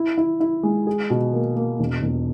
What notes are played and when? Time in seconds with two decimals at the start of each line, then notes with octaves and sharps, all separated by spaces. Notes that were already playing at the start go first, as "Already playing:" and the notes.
Already playing: E4
0.18 E4
0.40 E4
0.63 G#3
0.87 G#4
1.10 B2
1.33 A#3
1.56 A#3
1.79 E1
2.02 E1